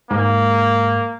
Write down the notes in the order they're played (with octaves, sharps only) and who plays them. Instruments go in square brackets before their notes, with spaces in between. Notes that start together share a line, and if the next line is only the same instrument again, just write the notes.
[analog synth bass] G#2 [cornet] A#3